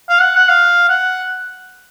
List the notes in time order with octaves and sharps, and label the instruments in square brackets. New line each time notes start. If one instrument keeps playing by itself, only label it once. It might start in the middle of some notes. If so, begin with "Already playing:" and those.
[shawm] F5
F#5
F#5
F5
F#5